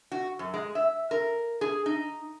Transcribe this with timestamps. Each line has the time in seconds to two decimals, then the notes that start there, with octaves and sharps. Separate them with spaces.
0.12 F#4
0.39 F#2
0.54 G#3
0.75 E5
1.11 A#4
1.61 G#4
1.86 D#4